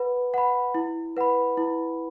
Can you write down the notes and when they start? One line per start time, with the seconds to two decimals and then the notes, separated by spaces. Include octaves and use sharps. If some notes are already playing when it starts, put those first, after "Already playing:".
Already playing: B4 F#5 B5
0.34 F#5 B5
0.75 E4
1.17 B4 F#5 B5
1.57 E4